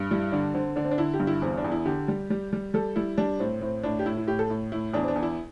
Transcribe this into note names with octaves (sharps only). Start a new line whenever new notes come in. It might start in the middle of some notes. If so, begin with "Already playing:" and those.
Already playing: G2
G3 E4
D3 D4
D3 C4
D3 D4
C4
D4
D3 E4
G4
G2
E4
E2 C4
D4
E2
E4
D3 G4
G3
G3
G3
G3 A4
G3 E4
G3 D4
A2 C4
A2 C4
A2 D4
G4
A2 E4
E4
A2 G4
A4
A2
A2 E4
E2 D4
C4
D4
E2
E4